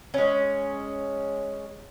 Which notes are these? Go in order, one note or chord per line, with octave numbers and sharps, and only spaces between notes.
G#3 C#4